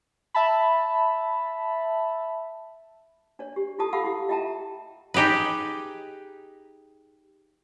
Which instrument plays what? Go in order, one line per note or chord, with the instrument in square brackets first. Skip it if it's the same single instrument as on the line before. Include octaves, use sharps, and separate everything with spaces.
[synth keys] E5 A5 B5
[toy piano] D4 C#5 D5
G4
E4 F4 G4 A4 A5 D#6
G4 A4 F5 F#5 B5 E6
E4 G4
F4 D#5 E5 G5 A5 A#5
[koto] D#4 G4 G#4 B4